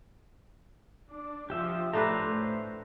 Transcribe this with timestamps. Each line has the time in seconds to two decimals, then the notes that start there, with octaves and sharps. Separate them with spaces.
1.08 D4
1.50 F3 G4 E5
1.93 A2 A3 D4 B4 C5 A#5